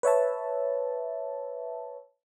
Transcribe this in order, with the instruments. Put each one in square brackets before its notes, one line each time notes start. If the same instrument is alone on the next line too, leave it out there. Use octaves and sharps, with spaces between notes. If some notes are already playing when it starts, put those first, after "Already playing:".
[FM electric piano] B4 C#5 E5 A5